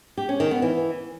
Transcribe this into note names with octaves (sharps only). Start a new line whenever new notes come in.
G4
C#4
D#3
B3
E3